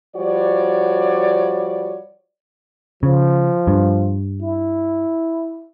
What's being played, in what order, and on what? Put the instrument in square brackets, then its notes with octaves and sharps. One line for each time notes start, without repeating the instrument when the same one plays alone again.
[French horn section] F3 G3 F#4 C#5 D5
[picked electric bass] C#3 [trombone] F3
[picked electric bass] G2
[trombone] E4